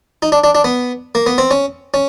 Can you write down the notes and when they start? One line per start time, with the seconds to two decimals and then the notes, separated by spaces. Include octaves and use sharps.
0.22 D#4
0.32 D4
0.44 D4
0.55 D4
0.64 B3
1.15 A#3
1.27 B3
1.38 C4
1.51 C#4
1.94 C#4